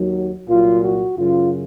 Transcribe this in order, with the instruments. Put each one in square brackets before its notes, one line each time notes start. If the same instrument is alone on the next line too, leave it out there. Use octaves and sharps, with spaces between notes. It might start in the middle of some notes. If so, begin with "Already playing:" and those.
Already playing: [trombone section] D#2 D#3 F#3
C2 A#2 F#3 F4
F#4
F#2 C#3 F#3 F4